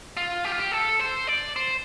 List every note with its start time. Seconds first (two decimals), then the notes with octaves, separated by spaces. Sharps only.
0.17 F4
0.44 G4
0.52 F4
0.59 G4
0.72 A4
0.99 C5
1.27 D5
1.56 C5